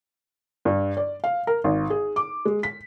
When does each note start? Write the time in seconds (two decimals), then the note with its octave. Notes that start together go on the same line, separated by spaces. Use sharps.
0.65 G2
0.97 D5
1.24 F5
1.47 A#4
1.64 G#1
1.90 G#4
2.16 D6
2.45 G#3
2.63 B6